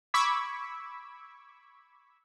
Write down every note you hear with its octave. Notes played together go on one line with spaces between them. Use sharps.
B5 C#6 D6 E6 G#6 B6